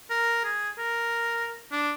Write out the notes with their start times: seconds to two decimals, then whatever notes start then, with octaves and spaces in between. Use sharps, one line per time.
0.10 A#4
0.45 G#4
0.78 A#4
1.72 D4